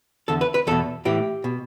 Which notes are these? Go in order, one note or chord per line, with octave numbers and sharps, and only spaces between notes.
E2 D3 A4
B4
B4
E2 B2 A4
A2 E3 G4
B2